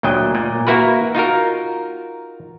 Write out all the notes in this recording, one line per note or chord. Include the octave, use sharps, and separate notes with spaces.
D2 A#2 F#3 D#5 G5
A#2
A#3 E4 F#4 A#4 B4
D#4 F4 F#4 A#4